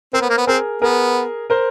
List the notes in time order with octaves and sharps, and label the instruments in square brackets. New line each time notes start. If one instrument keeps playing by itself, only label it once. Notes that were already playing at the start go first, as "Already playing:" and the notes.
[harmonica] C4 [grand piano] A#4 C5
[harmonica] B3
A#3
B3
[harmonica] C4 [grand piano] G#4 A#4
[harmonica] B3 [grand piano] G#4 A#4
[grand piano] A#4 C5